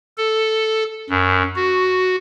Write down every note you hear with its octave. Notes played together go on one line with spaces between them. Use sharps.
A4
F#2
F#4